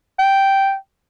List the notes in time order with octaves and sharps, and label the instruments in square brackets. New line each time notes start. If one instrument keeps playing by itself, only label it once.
[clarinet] G5